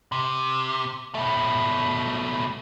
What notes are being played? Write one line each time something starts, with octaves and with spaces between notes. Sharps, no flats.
C3
B2 A3